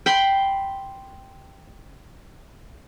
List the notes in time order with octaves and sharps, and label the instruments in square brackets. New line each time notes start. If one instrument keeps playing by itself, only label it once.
[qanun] G5 B5 C6